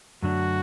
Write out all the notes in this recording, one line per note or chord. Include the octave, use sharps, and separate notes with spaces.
F#2 D3 F#3 A3 D4 F#4